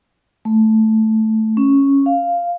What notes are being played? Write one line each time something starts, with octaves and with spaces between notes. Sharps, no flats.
A3
C#4
F5